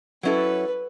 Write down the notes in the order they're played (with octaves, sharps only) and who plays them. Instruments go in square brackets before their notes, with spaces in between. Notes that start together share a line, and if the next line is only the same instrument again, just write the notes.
[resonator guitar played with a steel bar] F#3 C#4 E4 A4 [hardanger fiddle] B4